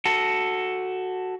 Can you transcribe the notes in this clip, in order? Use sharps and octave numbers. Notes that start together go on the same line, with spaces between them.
F#4 A4